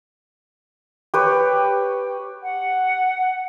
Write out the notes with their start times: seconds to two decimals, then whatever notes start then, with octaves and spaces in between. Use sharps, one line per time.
1.14 G4 B4 C#5
2.43 F#5